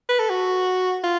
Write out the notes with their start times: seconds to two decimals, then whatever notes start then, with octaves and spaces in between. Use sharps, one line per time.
0.09 B4
0.19 A4
0.30 F#4
1.04 F4